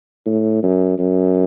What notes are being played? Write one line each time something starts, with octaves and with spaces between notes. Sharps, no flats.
A2
F#2
F#2